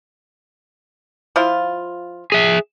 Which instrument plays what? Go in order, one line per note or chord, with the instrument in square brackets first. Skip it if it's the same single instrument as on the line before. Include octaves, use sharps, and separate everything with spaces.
[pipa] F3 E4 F4
[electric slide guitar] G#4 E5